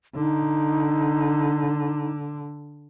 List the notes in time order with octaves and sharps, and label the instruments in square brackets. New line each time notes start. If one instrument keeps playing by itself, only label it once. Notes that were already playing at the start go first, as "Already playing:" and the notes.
[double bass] D3 [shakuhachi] D#4